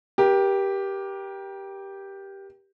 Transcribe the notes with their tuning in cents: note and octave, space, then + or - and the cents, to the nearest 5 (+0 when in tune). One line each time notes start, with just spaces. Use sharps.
G4 +0 A#4 +35